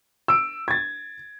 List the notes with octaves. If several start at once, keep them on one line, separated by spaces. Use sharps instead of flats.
E6 D7
G#6 A6